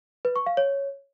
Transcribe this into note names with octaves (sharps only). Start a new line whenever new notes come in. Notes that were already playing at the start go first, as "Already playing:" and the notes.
B4
C#6
F5
C#5